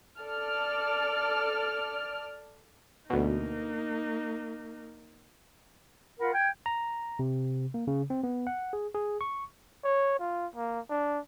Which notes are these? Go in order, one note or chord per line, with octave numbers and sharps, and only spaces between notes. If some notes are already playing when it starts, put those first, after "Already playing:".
A4 D5 F6
D2 B2 A#3 D#4
F4 A#4 F#5 B5
G5 G#6
A#5
C3
A#3
C#3
C4
B3
F#5
G#4
G#4
C#6
C#5
F4
A#3
D4